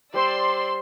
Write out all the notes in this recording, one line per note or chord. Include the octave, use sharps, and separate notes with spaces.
G3 C5 D5 C6 E6